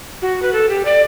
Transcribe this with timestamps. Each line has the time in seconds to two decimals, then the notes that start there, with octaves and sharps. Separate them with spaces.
0.22 F#4
0.42 B4
0.53 A4
0.69 G4
0.85 D5